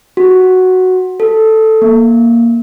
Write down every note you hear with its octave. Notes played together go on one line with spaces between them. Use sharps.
F#4
A4
A#3